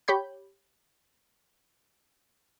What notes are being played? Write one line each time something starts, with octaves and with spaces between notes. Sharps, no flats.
G4 C#5 B5 G6